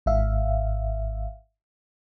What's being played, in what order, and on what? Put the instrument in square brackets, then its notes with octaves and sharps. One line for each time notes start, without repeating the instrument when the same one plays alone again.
[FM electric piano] G#1 G#2 E5 F5